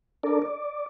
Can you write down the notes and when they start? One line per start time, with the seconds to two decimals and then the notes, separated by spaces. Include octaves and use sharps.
0.23 D4 A4 A#4 D5
0.42 D5